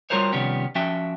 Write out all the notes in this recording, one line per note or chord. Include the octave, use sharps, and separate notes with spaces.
G3 F4 F#4 A#4 C5 C#5
C3 D#3 F3 G3 B3 C#4
F3 C#4 F#4 E5 G5